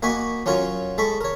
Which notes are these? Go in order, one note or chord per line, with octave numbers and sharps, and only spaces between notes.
A#3 F#4 D#5 G#5 B5 C#6
F#3 C#4 F4 A#4 C#5
G#3 A4 B5 C#6
A#4 C#5